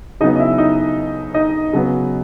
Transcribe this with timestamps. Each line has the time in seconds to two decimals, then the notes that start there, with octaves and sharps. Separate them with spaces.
0.20 C#3 F#3 B3 D#4 D#5
0.35 D#5
0.39 E4 E5
0.58 D#4 D#5
1.34 D#4 D#5
1.73 C#3 F#3 B3